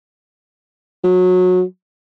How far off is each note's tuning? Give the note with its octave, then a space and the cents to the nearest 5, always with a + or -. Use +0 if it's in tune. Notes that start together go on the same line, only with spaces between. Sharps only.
F#3 -25